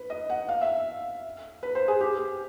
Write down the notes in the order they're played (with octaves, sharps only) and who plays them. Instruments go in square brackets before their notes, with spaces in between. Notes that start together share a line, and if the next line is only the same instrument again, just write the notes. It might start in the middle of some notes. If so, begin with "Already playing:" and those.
Already playing: [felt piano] B4
D#5
F#5
F5
E5
B4
C5
G#4
G4